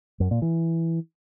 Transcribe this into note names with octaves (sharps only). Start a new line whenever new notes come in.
F#2
A#2
E3